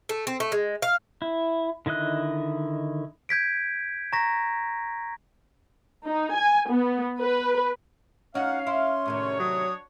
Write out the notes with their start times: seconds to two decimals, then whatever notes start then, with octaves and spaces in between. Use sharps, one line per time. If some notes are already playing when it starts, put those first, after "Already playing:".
0.09 A3
0.27 C4
0.40 A3
0.52 G#3
0.82 F5
1.22 E4
1.86 D3 D#3 E4 D#5 F#6
3.29 G6 G#6 B6 D7
4.13 A#5 C#6 A#6 B6
6.05 D#4
6.34 G#5
6.70 B3
7.21 B4
8.35 C#4 D#4 F#4 F5 F#5
8.67 E4 C6
9.06 A2 C3 D#3 D4 F#4 C#5
9.39 F#3 D#6